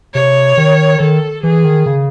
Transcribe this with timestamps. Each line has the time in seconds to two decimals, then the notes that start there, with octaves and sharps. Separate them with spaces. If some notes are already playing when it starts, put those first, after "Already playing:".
0.14 C3 C#5
0.57 D#3
1.00 D#3 A4
1.43 E3 G#4
1.64 D#3
1.86 C#3